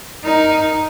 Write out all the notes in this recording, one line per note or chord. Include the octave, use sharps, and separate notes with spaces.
D#4 A#4